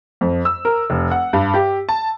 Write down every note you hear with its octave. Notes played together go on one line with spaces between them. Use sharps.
F2
E6
A#4
F1
F#5
G2
G4
A5